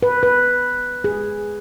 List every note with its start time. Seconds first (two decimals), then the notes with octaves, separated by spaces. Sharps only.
0.03 B4
0.23 B4
1.04 G#4